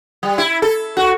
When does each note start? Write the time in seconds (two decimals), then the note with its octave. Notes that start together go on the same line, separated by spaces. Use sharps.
0.23 G3
0.38 E4
0.62 A4
0.97 F#4